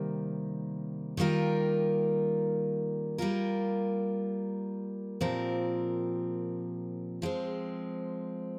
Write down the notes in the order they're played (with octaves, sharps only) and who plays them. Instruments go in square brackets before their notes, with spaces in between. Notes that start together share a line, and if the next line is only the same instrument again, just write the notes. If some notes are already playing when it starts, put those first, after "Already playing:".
Already playing: [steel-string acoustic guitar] C3 D#3 G3 A#3
D#3 G3 A#3 F4 A#4
G3 A#3 F4 A#4
A#2 F3 C4 G4 A#4
F3 G#3 C4